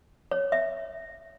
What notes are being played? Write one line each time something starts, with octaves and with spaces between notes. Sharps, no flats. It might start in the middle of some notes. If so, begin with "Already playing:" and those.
C#5
E5